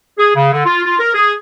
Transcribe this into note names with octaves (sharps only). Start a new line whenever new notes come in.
G#4
C#3
D3
F4
F4
A#4
G#4